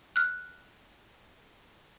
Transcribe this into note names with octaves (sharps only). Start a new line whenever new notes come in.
F6 F#6